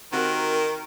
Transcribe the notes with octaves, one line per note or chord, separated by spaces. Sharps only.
D#3 C4 F#4 G4 A#4